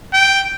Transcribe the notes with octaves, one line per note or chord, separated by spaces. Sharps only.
G5